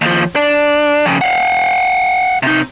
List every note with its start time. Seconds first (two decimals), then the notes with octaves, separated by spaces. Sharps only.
0.02 D#2 F3
0.36 D4
1.06 F2 C#3
1.21 F5 F#5
2.43 C3 D#4